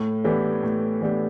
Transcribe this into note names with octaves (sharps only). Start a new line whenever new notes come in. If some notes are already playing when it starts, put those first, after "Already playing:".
Already playing: A2
E3 B3 D4 G4
A2
E3 B3 D4 G4